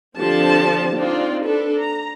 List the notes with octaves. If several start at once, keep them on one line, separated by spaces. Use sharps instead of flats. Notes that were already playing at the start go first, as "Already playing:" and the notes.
D3 F3 C4 D4 G4 A5
C4 D4 D#4 F4 D5
D4 A4 B4
A#5